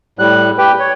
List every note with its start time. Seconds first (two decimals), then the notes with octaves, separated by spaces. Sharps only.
0.19 A2 G3 F#6
0.58 G4 B4 G5
0.79 C#5